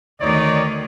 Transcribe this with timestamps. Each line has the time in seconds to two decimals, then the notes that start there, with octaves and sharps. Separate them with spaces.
0.21 D2 D#3 D#4 C#5 D5